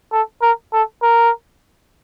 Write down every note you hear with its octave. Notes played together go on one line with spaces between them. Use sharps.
A4
A#4
A4
A#4